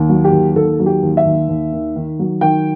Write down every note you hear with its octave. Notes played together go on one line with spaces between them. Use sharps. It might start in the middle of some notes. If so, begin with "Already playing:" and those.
Already playing: D#2
F#3
G4
D#2
D#2 A4
F#3
G4
D#2
E5
D#2
D#2
D#3
D#3
F#3
D#3 G5